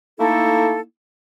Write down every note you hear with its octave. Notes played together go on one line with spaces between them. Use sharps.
A3 A#3 D#4 E4 A4